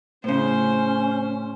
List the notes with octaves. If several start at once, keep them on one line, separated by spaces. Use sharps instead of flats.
A2 C#3 C#4 C5